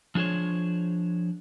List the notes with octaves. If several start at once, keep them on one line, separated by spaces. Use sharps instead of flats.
F3 D4 G#4 C5 C#5